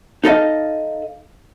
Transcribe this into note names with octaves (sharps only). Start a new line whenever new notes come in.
D#4 A4 D#5 F5